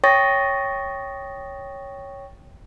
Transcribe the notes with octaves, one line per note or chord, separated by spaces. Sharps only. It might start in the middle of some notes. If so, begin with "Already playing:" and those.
C#5 G5 C#6 D#6 A6 A#6